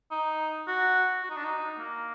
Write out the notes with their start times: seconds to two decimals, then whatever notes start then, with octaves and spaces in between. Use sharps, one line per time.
0.11 D#4
0.68 F#4
1.23 F#4
1.30 D#4
1.36 D4
1.44 D#4
1.79 A#3